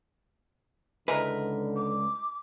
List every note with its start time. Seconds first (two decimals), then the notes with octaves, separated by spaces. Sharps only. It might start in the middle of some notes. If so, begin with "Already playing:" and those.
1.08 C#2 D3 G#3 E4 A#4 B4
1.76 D6